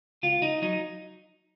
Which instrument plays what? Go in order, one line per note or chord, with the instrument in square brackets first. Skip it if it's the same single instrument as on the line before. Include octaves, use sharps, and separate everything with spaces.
[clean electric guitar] C#2 F4
D#4
F#3 D#4